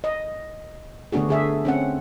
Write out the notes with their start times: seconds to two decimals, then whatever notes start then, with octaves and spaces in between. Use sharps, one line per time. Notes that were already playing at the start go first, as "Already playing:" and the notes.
0.04 D#5
1.12 D3 A3 B3 D4 F#4 G#4
1.29 D3 G#4 E5
1.65 C4 C#4 F#5